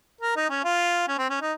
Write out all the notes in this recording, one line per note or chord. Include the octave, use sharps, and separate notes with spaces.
A#4
D#4
C#4
F4
C#4
C4
C#4
D#4